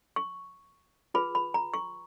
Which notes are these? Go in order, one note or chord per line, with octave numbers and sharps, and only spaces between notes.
C#6
F4 G#4 B4 B5
B5
A#5
C#6